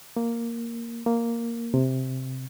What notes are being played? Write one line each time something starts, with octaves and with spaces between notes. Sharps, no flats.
A#3
A#3
C3